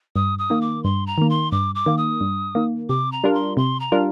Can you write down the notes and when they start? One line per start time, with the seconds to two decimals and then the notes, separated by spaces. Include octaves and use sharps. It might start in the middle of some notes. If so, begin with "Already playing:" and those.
0.16 G2 D#6
0.39 D#6
0.50 D#3 A#3
0.61 D6
0.84 G2 C6
1.07 A#5
1.18 D#3 A#3
1.30 C6
1.52 G2 D6
1.75 D6
1.86 D#3 A#3
1.98 D#6
2.21 G2
2.55 D#3 A#3
2.89 C3 D6
3.12 A#5
3.24 G3 D4 F4 A#4
3.34 C6
3.57 C3 C6
3.80 A#5
3.92 G3 D4 F4 A#4